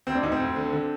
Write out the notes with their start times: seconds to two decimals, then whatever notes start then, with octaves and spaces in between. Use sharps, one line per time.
0.07 D2 C4
0.15 D4
0.23 D2 D#4
0.32 C4
0.40 D2
0.56 D3
0.73 D3